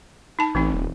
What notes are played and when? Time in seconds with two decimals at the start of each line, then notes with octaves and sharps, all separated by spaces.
0.39 D#4 A5
0.55 A1 E3 C4 D#4
0.74 D#1